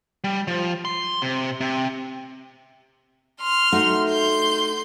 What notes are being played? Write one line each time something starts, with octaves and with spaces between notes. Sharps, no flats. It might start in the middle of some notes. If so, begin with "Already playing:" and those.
G3
F3
C6
C3
C3
C6 F6
A3 D#4 F#4
C6 G6